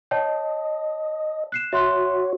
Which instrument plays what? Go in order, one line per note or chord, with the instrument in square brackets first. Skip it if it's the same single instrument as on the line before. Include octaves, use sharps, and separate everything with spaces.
[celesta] C#5 G5 A5 [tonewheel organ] D#5
[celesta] F#6 C7 E7
[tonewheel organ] F#4 C#5 [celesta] E5 C6 F#6